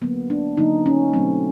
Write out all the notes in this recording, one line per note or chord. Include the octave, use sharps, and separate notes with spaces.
D3 F#3 A#3 B3
D4
D3 F#3 A#3 D#4
C#4
B2 F#3 A3 C4